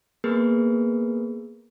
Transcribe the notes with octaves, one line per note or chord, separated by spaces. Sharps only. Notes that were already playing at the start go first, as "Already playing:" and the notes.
A#3 B3 G#4 A#4 B4